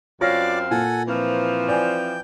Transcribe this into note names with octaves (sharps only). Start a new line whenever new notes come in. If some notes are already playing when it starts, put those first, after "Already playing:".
F#2 C4 F4 C#5 D5 F5 D6 A#6
A#2 A4 F#5 G#5
E3 F3 C4 A#4
D5 G5 G#5